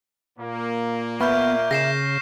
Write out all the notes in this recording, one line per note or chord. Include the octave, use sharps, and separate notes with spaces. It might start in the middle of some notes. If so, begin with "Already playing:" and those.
A#2 A#3
B3 E5 C#6 F6 G6
C#3 A#6 C7 E7